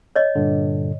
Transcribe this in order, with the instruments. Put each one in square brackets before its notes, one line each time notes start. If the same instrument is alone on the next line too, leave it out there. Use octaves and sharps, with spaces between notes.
[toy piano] C#5 D#5
[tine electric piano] G2 A#2 D3